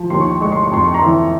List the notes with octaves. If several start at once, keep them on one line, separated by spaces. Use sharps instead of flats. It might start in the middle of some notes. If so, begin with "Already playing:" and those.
Already playing: F3
D#2 C6
C#6
C6
G#3 C#6
C6
C#6
F2 C6
C#6
A#5 C6
E3